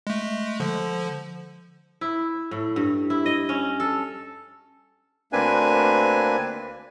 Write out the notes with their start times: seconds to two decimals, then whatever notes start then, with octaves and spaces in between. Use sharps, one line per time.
0.07 G#3 A3
0.60 D3 F3
2.01 E4
2.51 A2
2.76 G2
3.10 E4
3.26 D#5
3.49 C#4
3.80 A4
5.33 D2 A#3 C4 D4 B4 G#5